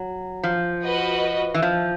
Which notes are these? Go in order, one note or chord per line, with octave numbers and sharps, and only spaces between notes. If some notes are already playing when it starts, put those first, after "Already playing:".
Already playing: F#3
F3
F#4 B4 D#5
E3
F3